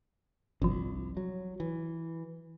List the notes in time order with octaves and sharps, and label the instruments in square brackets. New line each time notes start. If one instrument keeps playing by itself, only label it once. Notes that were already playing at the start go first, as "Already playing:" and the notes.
[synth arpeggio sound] G1 F3 [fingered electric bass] C2
[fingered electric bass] F#3
E3